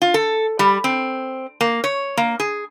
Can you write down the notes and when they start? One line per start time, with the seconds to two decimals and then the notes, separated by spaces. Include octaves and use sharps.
0.02 F4
0.14 A4
0.59 G3
0.84 C4
1.61 A#3
1.84 C#5
2.17 A#3
2.40 G#4